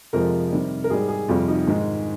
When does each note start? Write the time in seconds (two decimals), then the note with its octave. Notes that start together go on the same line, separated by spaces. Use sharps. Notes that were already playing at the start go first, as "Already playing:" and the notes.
0.13 F2 C3 F3 G#3 A#4
0.52 C3 D#3 G3
0.84 A#4
0.90 G#2 G3 G#4
1.09 G#4
1.28 F2 C3 G3 F4
1.48 D#4
1.67 G#2 D#3 G#3